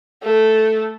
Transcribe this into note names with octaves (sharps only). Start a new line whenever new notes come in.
A3 A4